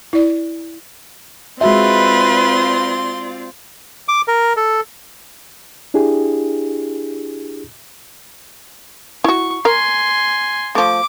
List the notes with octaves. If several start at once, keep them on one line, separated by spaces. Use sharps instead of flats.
E4 D5
G#3 C4 F4 F#4 B4 D5 E5 C6
D6
A#4
A4
D4 E4 G4 G#4
E4 F#4 C#6
A#4 G#5 A#5 C6
F3 A3 D6